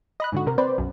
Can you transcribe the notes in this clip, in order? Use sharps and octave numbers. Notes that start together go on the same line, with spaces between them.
D#5 B5 F#6
G#2 D3 F#4
C3 A#4
C4 B4 C5 D5
B1 F#2